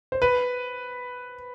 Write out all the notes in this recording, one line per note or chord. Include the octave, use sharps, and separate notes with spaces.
C5
B4